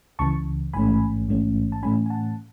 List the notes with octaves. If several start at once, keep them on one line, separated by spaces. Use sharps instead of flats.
C#2 C#3 E3 A5 C#6
A1 G#2 E3 A3 C#4 G#5 B5
A1 G#2 E3 A3 C#4
A5
A2 E3 A3 C#4 G#5 B5
G#5
F#5 A5